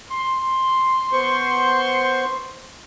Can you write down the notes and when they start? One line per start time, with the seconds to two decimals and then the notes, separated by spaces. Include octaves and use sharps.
0.10 C6
1.13 B3 C5 C#6